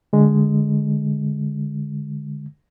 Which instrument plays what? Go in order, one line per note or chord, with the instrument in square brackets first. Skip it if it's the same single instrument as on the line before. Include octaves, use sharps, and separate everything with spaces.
[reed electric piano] D3 G#3